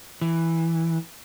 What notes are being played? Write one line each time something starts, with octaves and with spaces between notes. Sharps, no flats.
E3